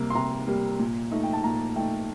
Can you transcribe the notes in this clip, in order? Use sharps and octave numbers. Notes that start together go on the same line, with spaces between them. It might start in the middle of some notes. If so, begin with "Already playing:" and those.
Already playing: C3 G3 A#3
C6
C3 A#5
G3 A#3
A#2
A3 D#4
G5
A5
A#2 A#5
A3 D#4 G5